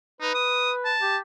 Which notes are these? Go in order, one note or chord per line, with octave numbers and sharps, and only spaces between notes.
D#4 B4
D#6
A5
G4